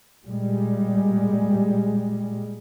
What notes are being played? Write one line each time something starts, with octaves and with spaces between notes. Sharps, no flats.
A#2 G3 G#3